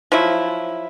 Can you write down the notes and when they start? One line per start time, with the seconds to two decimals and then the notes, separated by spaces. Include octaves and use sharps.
0.12 F3 F#3 E4